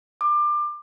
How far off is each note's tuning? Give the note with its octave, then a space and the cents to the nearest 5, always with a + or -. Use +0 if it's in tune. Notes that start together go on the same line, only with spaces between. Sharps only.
D6 +25